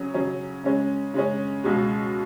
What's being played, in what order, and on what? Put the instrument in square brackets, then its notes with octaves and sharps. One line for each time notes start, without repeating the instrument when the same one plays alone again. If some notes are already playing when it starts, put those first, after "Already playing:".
Already playing: [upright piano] C#3 F#3 C#4
C#3 F#3 C#4
C#3 G#3 C#4
C#3 G#3 C#4
C#2 B2 G#3